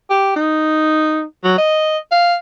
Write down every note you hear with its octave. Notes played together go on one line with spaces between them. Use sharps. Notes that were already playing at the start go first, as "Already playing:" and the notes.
G4
D#4
F#3
D#5
F5